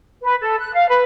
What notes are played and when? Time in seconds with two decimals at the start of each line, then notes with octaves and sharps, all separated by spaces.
0.23 B4
0.41 A4
0.59 F#6
0.74 F5
0.89 B4